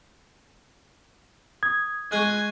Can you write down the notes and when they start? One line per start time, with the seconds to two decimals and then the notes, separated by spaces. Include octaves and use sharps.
1.63 D#6 G#6
2.12 G#3 G#5 C#6 F#6